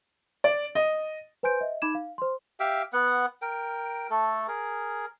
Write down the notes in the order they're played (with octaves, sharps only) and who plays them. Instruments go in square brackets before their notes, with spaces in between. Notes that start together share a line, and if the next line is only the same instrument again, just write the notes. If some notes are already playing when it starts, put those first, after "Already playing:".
[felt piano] D5
D#5
[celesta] B4 C5 G#5 C6 G6 D7
D#5 E5
D#4 B5 D6 G#6 E7
F5
C5 C6
[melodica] G4 E5 F5 G5
B3 F#5
A#4 G5
A3 A4
G#4 A#4